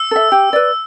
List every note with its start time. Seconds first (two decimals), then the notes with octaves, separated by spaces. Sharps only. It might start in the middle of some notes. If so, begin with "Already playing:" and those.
Already playing: E6
0.11 A4 E5
0.32 G4
0.53 B4 D5